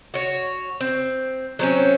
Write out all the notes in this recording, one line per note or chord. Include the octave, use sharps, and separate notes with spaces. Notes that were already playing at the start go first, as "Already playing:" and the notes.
F#4 C#5
C4
F#3 C4 C#4